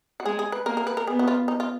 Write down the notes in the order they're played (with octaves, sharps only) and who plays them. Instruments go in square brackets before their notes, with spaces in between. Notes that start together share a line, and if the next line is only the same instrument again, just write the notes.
[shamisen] F#4
[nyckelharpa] G#3 [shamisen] G#4
[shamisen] G#4
B4
[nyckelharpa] A#3 [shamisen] A#4
[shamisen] A#4
B4
A#4
[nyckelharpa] B3 [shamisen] G#4
[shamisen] F#4
F4
D#4
F4